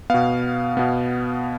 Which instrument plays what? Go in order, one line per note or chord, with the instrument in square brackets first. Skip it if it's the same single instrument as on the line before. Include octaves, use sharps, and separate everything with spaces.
[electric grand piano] B2 B3 F5
B2 B3